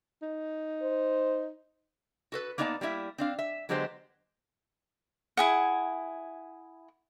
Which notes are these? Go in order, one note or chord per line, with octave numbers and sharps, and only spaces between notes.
D#4
C5
F#4 A4 B4
A#3 B3 D#4 D5 E5 A5
G3 A#3 E4 E5
C4 D4 F5
E5
D3 F#3 G#3 B3 G4 C5
E4 G#4 F#5